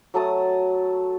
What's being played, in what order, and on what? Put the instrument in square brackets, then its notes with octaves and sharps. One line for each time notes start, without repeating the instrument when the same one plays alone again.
[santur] F#3 A3 A5 D#6